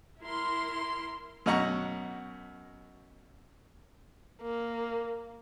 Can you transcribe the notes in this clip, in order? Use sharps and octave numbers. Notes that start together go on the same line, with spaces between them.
E4 A#4 C6
F#2 B2 D#5 F#5 A#5 C#6
A#3